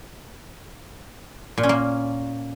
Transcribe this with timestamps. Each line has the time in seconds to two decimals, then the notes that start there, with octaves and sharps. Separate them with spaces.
1.58 A#2
1.63 C#4
1.69 A#3